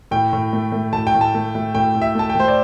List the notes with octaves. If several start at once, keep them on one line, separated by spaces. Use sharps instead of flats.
A2 G5
A2
A3
A3
A2 A5
G5
A2
A5
A3
A3
A2 G5
A2
E5
A3 A5
G5
A3 C5
D5